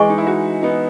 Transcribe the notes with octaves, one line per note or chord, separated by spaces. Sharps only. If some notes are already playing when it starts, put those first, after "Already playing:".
Already playing: E3 G#3 G#4 D#5 G#5 C#6
D#4
E4
D#4 F#4
B3 D#4